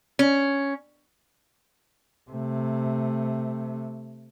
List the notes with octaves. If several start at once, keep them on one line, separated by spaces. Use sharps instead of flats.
C#4
C3 A3